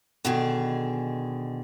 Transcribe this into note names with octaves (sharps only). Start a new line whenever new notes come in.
B2 D3 D#3 G#4